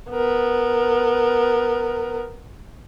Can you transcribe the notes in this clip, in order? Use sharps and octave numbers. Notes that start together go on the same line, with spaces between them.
B3 A#4